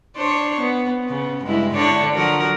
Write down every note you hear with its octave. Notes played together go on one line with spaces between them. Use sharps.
D4 C5 C#5
B3
C#3 B3
G2 G#3 E4
D3 D4 C#5
F3 F#3 A#4